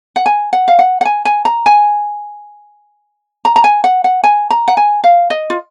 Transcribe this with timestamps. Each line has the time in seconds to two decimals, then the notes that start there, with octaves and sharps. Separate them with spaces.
0.16 F#5
0.26 G#5
0.53 F#5
0.68 F5
0.79 F#5
1.01 F#5
1.05 G#5
1.25 G#5
1.45 A#5
1.66 G#5
3.45 A#5
3.56 A#5
3.64 G#5
3.84 F#5
4.04 F#5
4.24 G#5
4.50 A#5
4.68 F#5
4.77 G#5
5.04 F5
5.30 D#5
5.50 F4